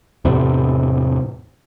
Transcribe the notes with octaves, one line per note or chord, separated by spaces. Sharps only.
E2 A2 C3